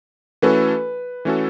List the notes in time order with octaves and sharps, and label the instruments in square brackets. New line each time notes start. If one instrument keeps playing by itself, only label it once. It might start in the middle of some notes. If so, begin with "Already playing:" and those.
[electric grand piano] E3 A3 C#4 F#4 A4 [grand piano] B4
[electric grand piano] E3 A3 C#4 F#4 A4